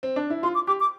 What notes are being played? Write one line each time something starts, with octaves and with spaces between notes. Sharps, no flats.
C4
D4
E4
F4 C6
D6
G4 D6
D6